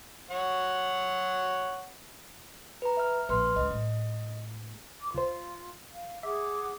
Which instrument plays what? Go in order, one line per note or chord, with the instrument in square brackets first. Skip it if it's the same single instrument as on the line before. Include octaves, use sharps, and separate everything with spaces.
[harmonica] C#5 F#5
[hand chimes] B4 A#5
E5 F6
[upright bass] A#1 [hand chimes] B4 C6 F6
[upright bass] C#2 [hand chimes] D#5
[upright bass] A2
[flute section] D6
[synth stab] C#2 C5 [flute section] F4
[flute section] F5
[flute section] G#4 F#5 D6 [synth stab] E5